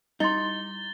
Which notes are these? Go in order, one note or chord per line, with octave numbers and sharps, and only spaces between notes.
G3 D#4 E4 C6 A6 G7